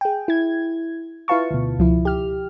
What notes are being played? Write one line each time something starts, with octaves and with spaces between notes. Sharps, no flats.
G#4 G5
E4 G#6
E4 F4 B4 F5 A5 C#6
D2 B2
C#2 F3 E4
G4 F6